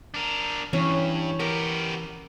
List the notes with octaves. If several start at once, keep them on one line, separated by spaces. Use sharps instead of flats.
D4 A#4
G2 E3 C#4
B3 G4 A#4